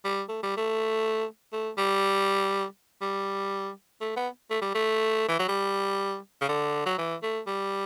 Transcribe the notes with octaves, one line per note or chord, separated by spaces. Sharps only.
G3
A3
G3
A3
A3
G3
G3
A3
B3
A3
G3
A3
E3
F#3
G3
C#3
D3
F#3
E3
A3
G3